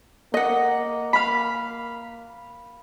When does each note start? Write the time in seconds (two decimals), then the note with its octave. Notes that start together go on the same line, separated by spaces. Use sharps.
0.34 A#3 D#5 F#5
1.13 F5 B5